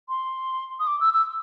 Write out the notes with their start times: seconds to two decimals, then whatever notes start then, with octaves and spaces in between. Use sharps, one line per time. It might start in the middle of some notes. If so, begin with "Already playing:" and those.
0.09 C6
0.80 D#6
0.87 D6
1.00 E6
1.14 E6